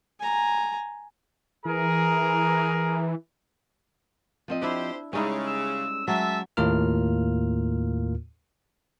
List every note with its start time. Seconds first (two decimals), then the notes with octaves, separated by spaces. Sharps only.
0.20 G#5 A#5
1.65 E3 G#4 A#4 A#5
4.48 F3 C4 D#5
4.62 D4 E4 G4 C5
5.13 C#3 G3 G#3 C#4 D#4 E4
5.47 E6
6.08 F#3 G#3 E5 A5
6.57 D#2 A2 A#3 F4 A#4 F6